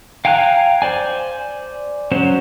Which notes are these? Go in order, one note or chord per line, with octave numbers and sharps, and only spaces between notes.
F5 G5 G#5 A#5 F#6
C5 D5 G#5
F#3 C#4 C5